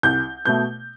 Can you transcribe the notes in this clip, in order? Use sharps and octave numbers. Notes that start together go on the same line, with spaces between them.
C2 G6
B2 A3 G6